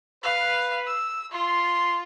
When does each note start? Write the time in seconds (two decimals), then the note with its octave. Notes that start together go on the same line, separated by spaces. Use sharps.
0.23 B4 F5
0.86 E6
1.32 F4 C6